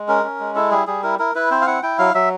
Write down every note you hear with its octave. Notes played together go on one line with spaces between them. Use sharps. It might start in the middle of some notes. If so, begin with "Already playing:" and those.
Already playing: G#3
C#4 A#4
C#4
G#3
E4 A4
G3 G#4
G3 G#4
E4 A#4
E4 A#4
E4 B4
C4 C5
F5
E4 F#5
E4 G5
F#3 F5
F#3 E5